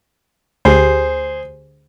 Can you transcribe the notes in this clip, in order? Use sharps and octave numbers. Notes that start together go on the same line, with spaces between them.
D2 G4 G#4 C5